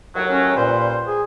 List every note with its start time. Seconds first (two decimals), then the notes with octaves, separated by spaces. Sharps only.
0.16 D#2 A2 F#3
0.31 C#4
0.56 A#2 G3 B4 C5
1.07 G#4